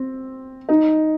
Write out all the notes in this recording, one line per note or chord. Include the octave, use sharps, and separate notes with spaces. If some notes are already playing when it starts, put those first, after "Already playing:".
Already playing: C4
D#4